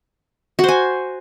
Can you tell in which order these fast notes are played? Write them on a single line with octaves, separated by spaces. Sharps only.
F#4 C5 G#5